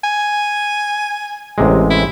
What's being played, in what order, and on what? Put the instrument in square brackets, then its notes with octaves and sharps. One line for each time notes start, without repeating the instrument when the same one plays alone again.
[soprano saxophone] G#5
[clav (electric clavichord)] A1 C3 G#3
[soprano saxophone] E4